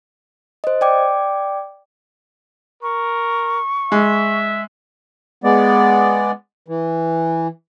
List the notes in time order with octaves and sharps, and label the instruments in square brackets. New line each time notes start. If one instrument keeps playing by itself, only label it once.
[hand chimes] C5 D#5
D5 G5 D6
[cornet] A#4 [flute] C#6
[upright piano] G#3 [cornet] E5
[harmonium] G#3 B3 D5
E3